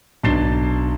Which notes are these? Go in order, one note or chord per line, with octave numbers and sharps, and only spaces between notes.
B1 D4 A6 C7 E7 G7